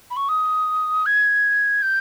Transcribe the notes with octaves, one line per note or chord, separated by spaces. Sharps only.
B5
C#6
D#6
G#6
G6